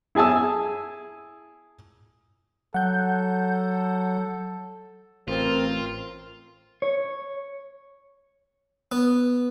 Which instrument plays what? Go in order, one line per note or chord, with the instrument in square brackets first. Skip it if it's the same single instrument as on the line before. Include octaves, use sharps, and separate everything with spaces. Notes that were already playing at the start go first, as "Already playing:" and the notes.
[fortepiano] E4 G#4 G#5 A5 E6
[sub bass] F#3 [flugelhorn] A4 [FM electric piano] F#5 G6
[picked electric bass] A1 [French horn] C4 [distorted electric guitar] F4 [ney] A#4
[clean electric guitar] C#5
[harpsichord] B3